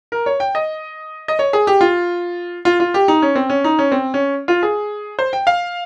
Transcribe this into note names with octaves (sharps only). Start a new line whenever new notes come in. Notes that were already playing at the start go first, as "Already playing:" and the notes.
A#4
C#5
G5
D#5
D#5
C#5
G#4
G4
F4
F4
F4
G4
D#4
C#4
C4
C#4
D#4
C#4
C4
C#4
F4
G#4
C5
G5
F5